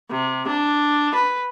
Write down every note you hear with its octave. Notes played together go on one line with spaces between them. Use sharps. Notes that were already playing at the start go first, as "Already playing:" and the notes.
C3
D4
B4